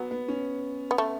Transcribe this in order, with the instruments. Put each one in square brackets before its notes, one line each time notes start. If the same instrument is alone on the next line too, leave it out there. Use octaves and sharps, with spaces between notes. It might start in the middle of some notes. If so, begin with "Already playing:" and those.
Already playing: [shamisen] F#3 [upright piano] B3
[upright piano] B3
C#4
[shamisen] B3
A3